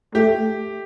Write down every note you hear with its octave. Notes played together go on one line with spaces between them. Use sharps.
A3 G4